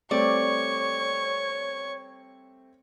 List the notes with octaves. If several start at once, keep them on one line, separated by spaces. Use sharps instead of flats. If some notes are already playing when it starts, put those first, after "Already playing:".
G3 A3 C4 C#5 D5 C#6